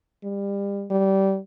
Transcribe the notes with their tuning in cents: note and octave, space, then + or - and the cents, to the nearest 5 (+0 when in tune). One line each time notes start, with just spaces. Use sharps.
G3 +30
G3 -20